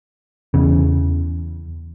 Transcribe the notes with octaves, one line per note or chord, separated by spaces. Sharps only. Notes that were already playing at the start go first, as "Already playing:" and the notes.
E2 C#3